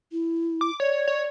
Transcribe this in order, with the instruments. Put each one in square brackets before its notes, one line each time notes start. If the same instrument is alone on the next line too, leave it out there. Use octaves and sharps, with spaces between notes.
[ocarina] E4
[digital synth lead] D6
[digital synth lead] C#5 [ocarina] D5
[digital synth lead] C#5